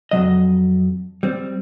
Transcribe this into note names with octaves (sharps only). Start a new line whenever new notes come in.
F2 E3 F#3 D#5
G3 C4